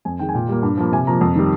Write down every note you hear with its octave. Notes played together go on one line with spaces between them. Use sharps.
F2 G#5
D#3 G#3 G5
G#5
A#2 G5
G3 A#3
G2
F3 A#3
C3 G#5
F3 A#3 A#5
F2
D#3 G3